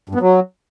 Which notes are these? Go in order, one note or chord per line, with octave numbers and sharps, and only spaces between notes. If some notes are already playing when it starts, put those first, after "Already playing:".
G2
B3
F#3